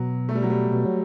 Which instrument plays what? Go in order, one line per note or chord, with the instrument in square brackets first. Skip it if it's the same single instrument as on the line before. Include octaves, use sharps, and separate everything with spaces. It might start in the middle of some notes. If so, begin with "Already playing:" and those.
Already playing: [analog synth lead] B2 [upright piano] F#3
[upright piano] A3
G3
F#3
G3
[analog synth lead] B2
F#3